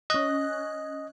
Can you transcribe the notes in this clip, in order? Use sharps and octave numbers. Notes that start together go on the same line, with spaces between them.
C#4 D#5 F#6